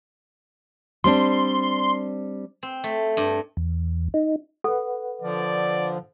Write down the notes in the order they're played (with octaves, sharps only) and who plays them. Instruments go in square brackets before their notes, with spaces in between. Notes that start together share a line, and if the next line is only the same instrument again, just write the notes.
[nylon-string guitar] G3 C4 D4 [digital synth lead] C6
[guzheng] C4
A3
G2
[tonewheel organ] E2
D#4
[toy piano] A4 [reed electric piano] B4 F#5
[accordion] D3 F3 [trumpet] D5